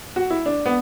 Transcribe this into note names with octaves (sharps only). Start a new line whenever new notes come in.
F#4
E4
D4
B3